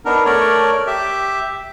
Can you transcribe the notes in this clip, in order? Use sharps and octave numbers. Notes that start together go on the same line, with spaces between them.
B3 D4 D#4 A#4
A3 A#4 C#5 D5
G4 E5